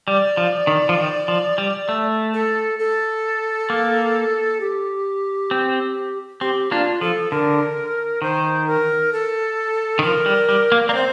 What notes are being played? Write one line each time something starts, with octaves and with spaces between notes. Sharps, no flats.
G3 D5
F3
D#3
F3
D#3
F3
G3
A3
A4
A4
A#3
G4
C4
C4 G4
A#3 D4 F4
F3 A4
D3 A#4
D#3 C5
A#4
A4
D#3
F3 A#4
G3
G3
A#3
A#3 D5
C4 C5